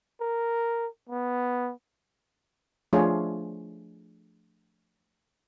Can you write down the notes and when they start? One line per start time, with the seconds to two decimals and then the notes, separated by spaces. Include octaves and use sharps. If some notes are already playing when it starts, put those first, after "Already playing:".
0.21 A#4
1.09 B3
2.93 F3 A3 D4 F4 G#4 C#5